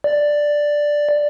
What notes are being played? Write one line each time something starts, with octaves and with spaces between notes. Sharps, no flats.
D5